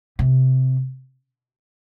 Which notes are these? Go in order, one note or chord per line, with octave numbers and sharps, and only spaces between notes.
C3